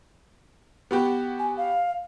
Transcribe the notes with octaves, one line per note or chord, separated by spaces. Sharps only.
B3 F#4 G4
G#5
F5